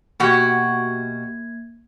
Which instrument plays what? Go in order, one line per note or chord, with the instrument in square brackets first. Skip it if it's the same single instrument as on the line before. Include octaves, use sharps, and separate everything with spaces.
[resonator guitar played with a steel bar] B2 F#4 G4 [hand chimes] A#3 G#6